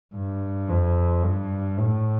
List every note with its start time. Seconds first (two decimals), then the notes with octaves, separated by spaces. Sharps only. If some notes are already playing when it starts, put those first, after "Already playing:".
0.15 G2
0.69 F2
1.23 G2
1.77 A2